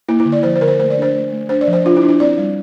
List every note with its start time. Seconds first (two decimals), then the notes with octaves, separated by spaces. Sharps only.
0.08 A#3 E4
0.20 E4
0.25 D3
0.32 D5
0.43 F3 C5
0.56 C5
0.61 D3 A#4
0.68 C5
0.79 A3 C5
0.90 D5
0.97 D4 C5
1.15 A3
1.32 A3
1.49 D4 C5
1.61 D5
1.68 F3
1.73 C5
1.85 D4 F4
1.97 E4
2.03 D4
2.09 E4
2.20 C4 D5
2.38 G3